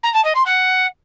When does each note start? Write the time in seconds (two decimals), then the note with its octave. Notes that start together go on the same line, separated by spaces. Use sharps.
0.03 A#5
0.14 A5
0.24 D#5
0.35 C6
0.46 F#5